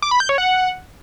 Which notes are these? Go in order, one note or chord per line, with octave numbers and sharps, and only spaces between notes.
D6
B5
G6
C#5
F#5